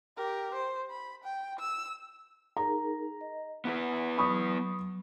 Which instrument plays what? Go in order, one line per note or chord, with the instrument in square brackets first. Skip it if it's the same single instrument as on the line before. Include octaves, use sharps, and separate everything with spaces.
[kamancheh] G4 A#4
C5
B5
G5
E6
[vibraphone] D#4 G#4 A#4 [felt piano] A#5
[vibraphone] D#5
[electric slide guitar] B3 E4 B4 [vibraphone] F#5 G#5
[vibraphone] F#3 [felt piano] B5 C#6 D#6